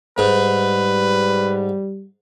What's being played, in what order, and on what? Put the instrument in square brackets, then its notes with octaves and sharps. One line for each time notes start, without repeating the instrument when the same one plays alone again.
[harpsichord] G#2 [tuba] G3 [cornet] B4